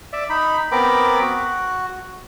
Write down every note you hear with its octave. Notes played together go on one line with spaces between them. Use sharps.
D5 E5
D#4 B5
B3 C4 A#4 B5 D6
F#4